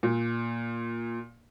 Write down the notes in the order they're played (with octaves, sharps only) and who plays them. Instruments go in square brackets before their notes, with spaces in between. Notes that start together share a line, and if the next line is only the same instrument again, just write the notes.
[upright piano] A#2